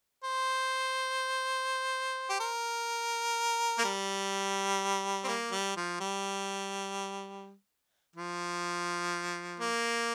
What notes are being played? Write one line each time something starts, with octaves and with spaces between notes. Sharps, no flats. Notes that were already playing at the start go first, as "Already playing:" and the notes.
C5
G4
A#4
A#3
G3
C4
A#3
G3
F3
G3
F3
A#3